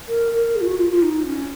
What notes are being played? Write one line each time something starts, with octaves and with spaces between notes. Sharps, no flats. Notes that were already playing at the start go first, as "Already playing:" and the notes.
A#4
A#4
G#4
F4
F#4
F4
F4
D#4
C#4